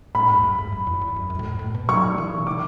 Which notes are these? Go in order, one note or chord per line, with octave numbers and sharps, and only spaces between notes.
A2 B5
G#2
E2
F#2
G#2
F#2
E2
E2
F#2
F#2
A2
G#2
A2
B2
F#3 C#6
E3
B2
C#3 D6